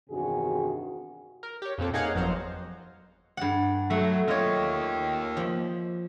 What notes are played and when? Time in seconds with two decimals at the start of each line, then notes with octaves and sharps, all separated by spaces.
0.10 E2 G2 C3 D#3 F#4 G#4
1.43 A#4
1.62 G4 C#5
1.78 F2 A#2 C4 A4
1.93 A#3 D#4 G#4 C#5 F5 F#5
2.14 G1 F2 F3 F#3 C5 A#5
3.37 G2 F#5
3.90 F#3 A3
4.28 A#3 F4 C#5 D#5
5.37 F3